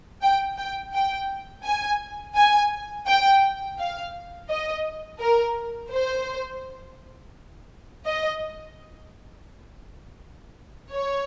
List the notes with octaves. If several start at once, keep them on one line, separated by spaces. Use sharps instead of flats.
G5
G5
G5
G#5
G#5
G5
F5
D#5
A#4
C5
D#5
C#5